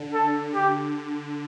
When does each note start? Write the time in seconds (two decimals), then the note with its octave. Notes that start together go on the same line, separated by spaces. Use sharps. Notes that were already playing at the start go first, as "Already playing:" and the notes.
Already playing: D3
0.14 A4
0.54 D3 G4